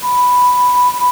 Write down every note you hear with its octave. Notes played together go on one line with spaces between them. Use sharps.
B5